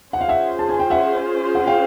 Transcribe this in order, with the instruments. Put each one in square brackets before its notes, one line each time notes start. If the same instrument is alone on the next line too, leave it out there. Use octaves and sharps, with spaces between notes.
[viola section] C#4 F4 G#4 C5 [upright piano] F#5
[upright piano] F5
E5 F#5
A5
G#5
G5
E5 F#5
F#5
F5 G5